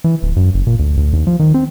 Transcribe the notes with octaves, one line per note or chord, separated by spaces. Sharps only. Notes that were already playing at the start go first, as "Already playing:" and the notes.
E3
D1
F#2
F#1
A#2
D2
D2
D#2
F3
D#3
C4